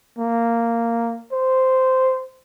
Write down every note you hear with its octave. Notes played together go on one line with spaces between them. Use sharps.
A#3
C5